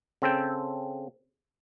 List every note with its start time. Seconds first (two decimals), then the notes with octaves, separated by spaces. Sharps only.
0.22 C#3 C4 A4 G5